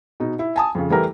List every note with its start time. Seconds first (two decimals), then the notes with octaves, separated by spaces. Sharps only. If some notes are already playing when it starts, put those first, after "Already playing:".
0.20 B2 D#4
0.39 E4
0.56 G#5 A5 D#6
0.75 F2 C#3
0.90 E3 G3 A3 G4 A#4